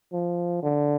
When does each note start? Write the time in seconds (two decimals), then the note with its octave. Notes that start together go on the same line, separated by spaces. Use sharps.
0.13 F3
0.63 D3